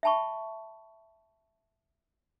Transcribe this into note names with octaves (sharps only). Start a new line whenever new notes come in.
E5 G5 A5 B5 C#6